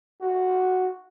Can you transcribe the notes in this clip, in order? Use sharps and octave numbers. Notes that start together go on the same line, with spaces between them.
F#4